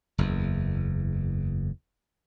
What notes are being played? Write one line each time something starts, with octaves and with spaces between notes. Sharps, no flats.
F#1 E2